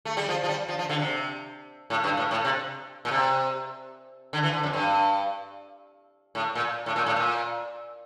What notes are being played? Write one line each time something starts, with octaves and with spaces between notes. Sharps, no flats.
A3
G3
F3
F3
G3
F3
F3
D3
C3
A2
G2
A2
A2
C3
A#2
C3
D3
E3
D3
F2
G2
A2
A#2
A2
A#2
A2
A#2